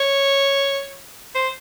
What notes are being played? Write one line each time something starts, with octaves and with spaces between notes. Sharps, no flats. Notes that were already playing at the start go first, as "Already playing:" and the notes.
Already playing: C#5
C5